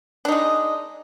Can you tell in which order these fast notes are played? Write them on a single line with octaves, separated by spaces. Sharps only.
D4 D#4 G#3